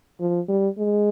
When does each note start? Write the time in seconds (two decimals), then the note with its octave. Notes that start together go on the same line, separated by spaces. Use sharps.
0.20 F3
0.48 G3
0.78 G#3